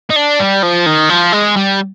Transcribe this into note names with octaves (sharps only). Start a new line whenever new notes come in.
D#4
D4
G3
F3
D#3
F3
G#3
G3